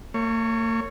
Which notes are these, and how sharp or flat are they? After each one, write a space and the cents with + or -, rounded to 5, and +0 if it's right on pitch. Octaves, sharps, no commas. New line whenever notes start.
A#3 -45 C#5 +0